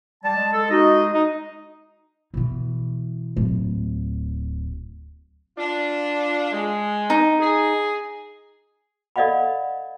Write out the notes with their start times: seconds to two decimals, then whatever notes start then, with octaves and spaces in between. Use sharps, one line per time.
0.24 G3 A5
0.36 G#3
0.52 A4
0.70 D#4 F#4 D#5
1.14 D#4
2.34 B2 E3
3.36 D1
5.58 D4 F4
6.52 G#3
7.10 D#4
7.39 G#4
9.16 A4 D5 D#5 F5 F#5 B5